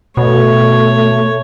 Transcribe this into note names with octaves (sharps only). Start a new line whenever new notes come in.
B2 A3 C#5